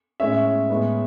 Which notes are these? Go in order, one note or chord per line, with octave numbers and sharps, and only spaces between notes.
A2 G#3 C#4 E5
A2 G#3 B3